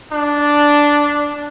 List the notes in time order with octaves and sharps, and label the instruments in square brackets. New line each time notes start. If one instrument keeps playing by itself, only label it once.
[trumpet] D4